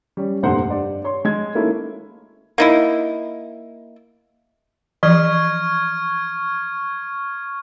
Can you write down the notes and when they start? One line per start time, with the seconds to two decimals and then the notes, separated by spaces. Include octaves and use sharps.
0.17 G3 C#4
0.43 F1 G2 A#2 D3 C5 F#5
0.67 G2 D5
1.04 C#5 C6
1.25 G#3 G#6
1.55 D#3 A3 A#3 C#4 E4
2.58 A#3 D#4 E4
5.03 E3 F3 C#6 F6 G#6